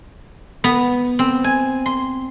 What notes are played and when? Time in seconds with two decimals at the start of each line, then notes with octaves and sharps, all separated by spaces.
0.64 B3
1.19 C4
1.44 G#5
1.86 C6